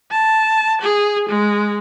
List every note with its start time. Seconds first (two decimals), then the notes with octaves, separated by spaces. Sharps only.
0.12 A5
0.82 G#4
1.29 G#3